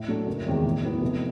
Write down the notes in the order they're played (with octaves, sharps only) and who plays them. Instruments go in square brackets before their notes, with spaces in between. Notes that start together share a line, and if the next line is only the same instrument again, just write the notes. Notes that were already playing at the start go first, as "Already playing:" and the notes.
Already playing: [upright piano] A2
F#3 A3 D4
F#1
E2 C3 D#3 G#3
A2
F#3 B3 E4
F1